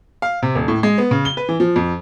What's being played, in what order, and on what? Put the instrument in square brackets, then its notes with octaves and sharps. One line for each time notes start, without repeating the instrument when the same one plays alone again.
[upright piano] F5
C3
D#1
A2
G#3
B3
C#3
G7
B4
E3
F3
F2